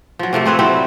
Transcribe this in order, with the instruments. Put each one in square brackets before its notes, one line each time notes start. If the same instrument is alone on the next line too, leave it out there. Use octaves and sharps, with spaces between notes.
[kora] F3 F#3
C3 F3 A3 A#3
A3 C4 B4 C#5
F#3 G3 C4 E4